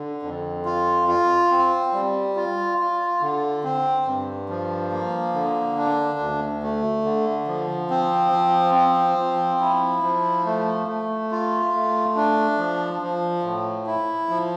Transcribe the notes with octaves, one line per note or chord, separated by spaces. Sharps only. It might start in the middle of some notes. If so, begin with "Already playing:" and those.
Already playing: D3
F2
F4
F4
C4
G3
F4
F4
D3
C4
G2
F3
A#3
D3
D4
D2
A3
D3
F3
C4
F3
C4
F3
E4
F3
A3
A3
F4
A3
D4
F3
F3
A2
E4
F3